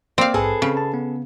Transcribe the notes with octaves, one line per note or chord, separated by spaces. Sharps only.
A#3 C4 D5 F5
A#1 G#2 G#4 A4 B4
C#3 C4
A5
B3